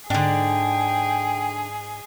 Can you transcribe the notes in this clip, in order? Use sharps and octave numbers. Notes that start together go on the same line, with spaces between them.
G#2 D3 D4 G#4 G5